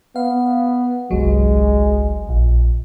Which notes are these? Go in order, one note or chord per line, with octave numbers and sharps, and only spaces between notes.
B3 F5
G1 C2 F#3 G#3
A#1